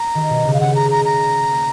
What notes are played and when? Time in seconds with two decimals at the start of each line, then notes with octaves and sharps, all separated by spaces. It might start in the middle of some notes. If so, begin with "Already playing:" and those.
Already playing: A#5
0.15 D#3
0.30 B2
0.44 C#3
0.53 F5
0.60 C#3 F#5
0.75 A#5
0.91 A#5
1.05 A#5
1.51 A#3